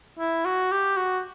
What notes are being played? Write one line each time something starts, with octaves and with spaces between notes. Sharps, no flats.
E4
F#4
G4
F#4